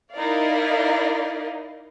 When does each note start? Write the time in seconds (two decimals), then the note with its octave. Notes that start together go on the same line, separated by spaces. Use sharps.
0.15 D#4 E4 A#4 D5 D#5 F5